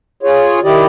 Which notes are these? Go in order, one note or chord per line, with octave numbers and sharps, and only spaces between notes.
F4 G#4 C#5
D#3 E4 G4 D5 D#5